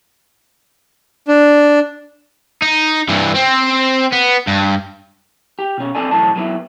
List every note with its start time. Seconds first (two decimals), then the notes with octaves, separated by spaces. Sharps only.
1.28 D4
2.62 D#4
3.09 G2 E3
3.35 C4
4.12 B3
4.48 G2
5.59 G4
5.78 B2 C#4
5.95 C4 D4 A4 D5 G#5
6.11 B1 E2 A2 F#3 A5
6.36 F#3 B3 E4